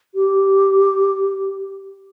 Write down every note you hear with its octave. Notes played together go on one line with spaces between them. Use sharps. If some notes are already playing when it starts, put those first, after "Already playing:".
G4